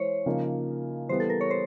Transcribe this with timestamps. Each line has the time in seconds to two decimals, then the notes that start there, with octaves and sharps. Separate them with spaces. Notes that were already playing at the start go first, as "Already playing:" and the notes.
Already playing: E3 G#3 E4 C5 C#5
0.26 C#3 F3 A#3 D#4
1.09 E3 G3 B3 C5
1.20 A4
1.30 A#4
1.41 C#5
1.51 C5